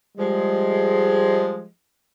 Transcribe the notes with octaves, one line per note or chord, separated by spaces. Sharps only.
F3 G3 G#3